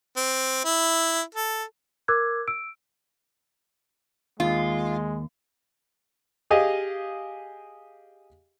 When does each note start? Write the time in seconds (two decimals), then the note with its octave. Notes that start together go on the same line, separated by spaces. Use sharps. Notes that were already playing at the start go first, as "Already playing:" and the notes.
0.17 C4
0.64 E4
1.35 A4
2.08 A#4 D6 E6 F#6 G#6
2.48 E6 D7
4.40 D#2 G#3 F4
6.50 G4 G#4 D#5 F5